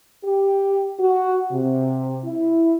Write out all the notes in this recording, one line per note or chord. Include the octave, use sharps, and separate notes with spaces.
G4
F#4
C3
E4